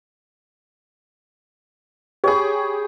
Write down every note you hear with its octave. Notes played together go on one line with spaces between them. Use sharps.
G4 G#4 C#5 G5 B5